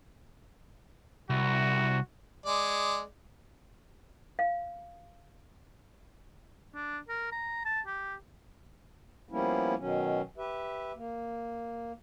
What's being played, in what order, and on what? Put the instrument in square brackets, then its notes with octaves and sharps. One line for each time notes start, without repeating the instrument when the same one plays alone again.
[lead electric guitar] C2 [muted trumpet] F#4
[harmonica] G#3 D5
[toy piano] F5
[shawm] D4
A#4
A#5
A5
G4
[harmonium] F3 G3 A#3 B3 C#4 E4
B2 D#3 F#3 C#4
G4 B4 E5
A#3